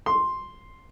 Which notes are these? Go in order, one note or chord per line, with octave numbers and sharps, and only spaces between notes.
C6